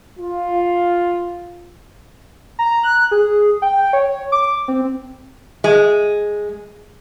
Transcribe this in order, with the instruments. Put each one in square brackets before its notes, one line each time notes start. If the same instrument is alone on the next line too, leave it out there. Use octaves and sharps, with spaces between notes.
[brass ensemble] F4
[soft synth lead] A#5
F#6
G#4
G5
C#5
D6
C4
[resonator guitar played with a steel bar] G#3